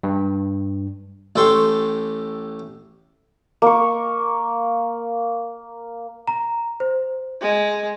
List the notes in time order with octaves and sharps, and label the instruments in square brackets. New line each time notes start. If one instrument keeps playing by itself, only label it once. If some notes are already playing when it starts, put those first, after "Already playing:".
[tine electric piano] G2
[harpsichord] A1 A2 G4 A4 C6 C#6
[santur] A#3 C#6
[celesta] A#5
C5
[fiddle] G#3